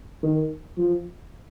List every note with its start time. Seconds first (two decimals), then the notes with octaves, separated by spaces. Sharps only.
0.23 D#3
0.78 F3